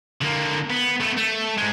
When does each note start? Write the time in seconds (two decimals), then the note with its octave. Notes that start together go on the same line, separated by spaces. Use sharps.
0.22 D3 A#3
0.70 B3
1.01 A3 B3
1.17 A3
1.58 G#2 G#3